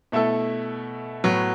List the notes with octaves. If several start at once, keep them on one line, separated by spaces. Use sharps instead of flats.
B2 A3 E4 A4
A2 F#3 B3